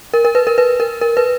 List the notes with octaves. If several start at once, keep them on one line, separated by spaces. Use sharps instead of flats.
A#4
A#4
B4
A#4
B4
A#4
A#4
B4